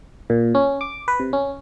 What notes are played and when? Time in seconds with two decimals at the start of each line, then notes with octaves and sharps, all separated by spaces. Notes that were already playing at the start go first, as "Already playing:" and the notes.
0.30 A#2
0.55 C#4
0.81 D6
1.08 B4
1.20 C3
1.33 C#4